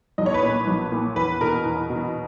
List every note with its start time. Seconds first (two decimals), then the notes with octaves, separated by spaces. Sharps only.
0.18 B1 D#5
0.26 C#5
0.34 B4
0.43 A#2 C#5
0.67 B1
0.92 A#2
1.16 E2 B4
1.41 B2 A#4
1.66 E2
1.90 B2